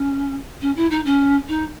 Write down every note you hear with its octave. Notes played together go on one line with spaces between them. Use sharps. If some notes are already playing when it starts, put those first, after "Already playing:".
Already playing: C#4
C#4
E4
D#4
C#4
D#4